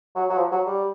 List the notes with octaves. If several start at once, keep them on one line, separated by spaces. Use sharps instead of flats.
F#3
F#3
F3
F#3
G3